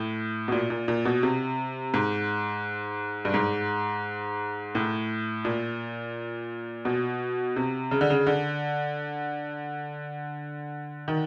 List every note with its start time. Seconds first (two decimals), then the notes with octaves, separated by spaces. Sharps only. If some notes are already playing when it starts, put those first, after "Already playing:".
Already playing: A2
0.48 B2
0.52 A#2
0.70 A#2
0.88 A#2
1.05 B2
1.23 C3
1.94 G#2
3.25 G2
3.34 G#2
4.75 A2
5.45 A#2
6.85 B2
7.56 C3
7.91 C#3
8.01 D3
8.10 C#3
8.27 D3
11.08 D#3